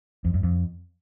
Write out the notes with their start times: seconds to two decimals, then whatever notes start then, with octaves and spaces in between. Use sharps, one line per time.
0.25 F2
0.34 F#2
0.43 F2